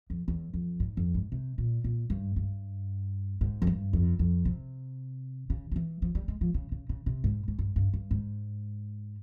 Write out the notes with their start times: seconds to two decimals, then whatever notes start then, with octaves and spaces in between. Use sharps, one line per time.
0.10 F2
0.28 E2
0.54 F2
0.80 G#2
0.97 F2
1.14 G#2
1.32 C3
1.58 A#2
1.84 A#2
2.10 G2
2.36 G2
3.41 G#2
3.62 F2
3.67 G2
3.93 F2
4.19 F2
4.45 C3
5.50 C#3
5.71 F3
5.76 E3
6.02 F3
6.15 G3
6.28 G#3
6.41 F3
6.54 C#3
6.72 C#3
6.89 C#3
7.06 C3
7.24 G#2
7.48 G#2
7.59 G2
7.76 G2
7.93 G2
8.11 G#2